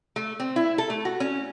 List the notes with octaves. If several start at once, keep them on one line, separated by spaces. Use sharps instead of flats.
A3
C4
E4
A4
A3
F#4
C#4